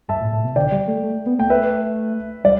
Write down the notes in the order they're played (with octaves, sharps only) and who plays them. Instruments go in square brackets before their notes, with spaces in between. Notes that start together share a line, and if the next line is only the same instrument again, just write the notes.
[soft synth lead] G2 [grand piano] E5 A5
[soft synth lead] A2
A2
B2
[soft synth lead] D3 [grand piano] D5 G5
[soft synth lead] G3
A3
A3
B3
[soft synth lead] A3 [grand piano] G5
[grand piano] B4 E5
[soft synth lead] G3 [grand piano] D5